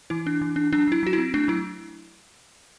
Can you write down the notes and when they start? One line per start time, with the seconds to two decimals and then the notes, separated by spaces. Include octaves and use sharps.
0.10 E3 E4
0.27 D4
0.41 E3
0.56 D4
0.73 F#3 D4
0.87 F#3 E4
1.03 F#3 F#4
1.13 E4
1.18 C4
1.34 A3 D4
1.48 F#3 E4